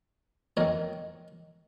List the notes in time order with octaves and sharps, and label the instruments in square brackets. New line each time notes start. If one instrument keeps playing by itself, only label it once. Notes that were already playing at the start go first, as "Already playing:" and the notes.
[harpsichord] F2 D#3 A#4 C#5